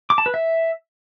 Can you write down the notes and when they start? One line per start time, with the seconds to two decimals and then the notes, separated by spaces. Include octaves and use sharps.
0.10 D6
0.18 A5
0.26 B4
0.34 E5